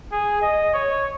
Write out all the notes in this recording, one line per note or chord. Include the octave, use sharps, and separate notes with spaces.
G#4
D#5
C#5